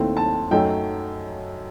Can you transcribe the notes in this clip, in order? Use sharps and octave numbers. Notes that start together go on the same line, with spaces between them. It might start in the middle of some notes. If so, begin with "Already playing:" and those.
Already playing: D#2 D#3 A3 C4 E4
A5
F#2 F#3 A3 D#4 G5